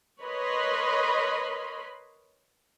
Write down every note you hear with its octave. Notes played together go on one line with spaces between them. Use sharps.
A#4 B4 C#5 D#5 B5 C6